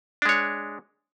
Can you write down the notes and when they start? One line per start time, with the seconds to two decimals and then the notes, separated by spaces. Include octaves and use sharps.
0.22 D4
0.25 G#3
0.29 C#5